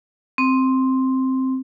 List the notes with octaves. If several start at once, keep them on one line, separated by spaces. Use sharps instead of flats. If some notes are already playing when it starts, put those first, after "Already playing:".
C4